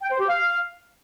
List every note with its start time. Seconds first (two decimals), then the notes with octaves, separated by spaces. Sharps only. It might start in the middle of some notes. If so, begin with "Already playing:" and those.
0.02 G5
0.11 C5
0.20 G4
0.28 F5